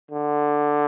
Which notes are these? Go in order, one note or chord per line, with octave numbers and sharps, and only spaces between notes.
D3